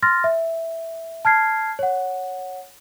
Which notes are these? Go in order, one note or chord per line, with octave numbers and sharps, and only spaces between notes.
C6 F6 A6 A#6
E5
A5 F6 G#6 C7
C#5 F#5